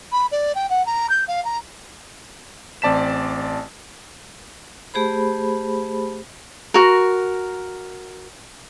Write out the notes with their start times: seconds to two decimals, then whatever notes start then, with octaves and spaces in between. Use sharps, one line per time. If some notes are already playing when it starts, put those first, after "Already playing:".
0.12 B5
0.31 D5
0.55 G5
0.69 F#5
0.86 A#5
1.09 G6
1.28 F5
1.45 A#5
2.82 A1 C4 D5 A5 B6 E7
4.94 A3 G4 G#4 C5 B5
6.74 F#4 A#4